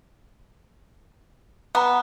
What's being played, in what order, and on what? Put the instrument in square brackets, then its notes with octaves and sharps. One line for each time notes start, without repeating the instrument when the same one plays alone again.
[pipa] B3 [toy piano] A#5 D6